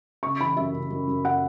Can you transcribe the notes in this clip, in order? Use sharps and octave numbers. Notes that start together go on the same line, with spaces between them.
C#3 C#6
E3 B5
F#2 E5
C#3
F#2
F#2
F#5